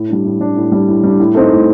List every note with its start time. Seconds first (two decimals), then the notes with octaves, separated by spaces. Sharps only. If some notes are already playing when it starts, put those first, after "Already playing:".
Already playing: A2
0.09 G3 D4
0.25 A2
0.40 G3 D4
0.57 A2
0.72 G3 D4
0.88 A2
1.03 G3 D4
1.20 A2
1.35 A3 C4 D#4
1.51 A2